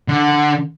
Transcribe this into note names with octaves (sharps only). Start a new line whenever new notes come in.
D3